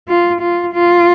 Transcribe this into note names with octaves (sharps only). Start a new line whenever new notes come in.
F4
F4
F4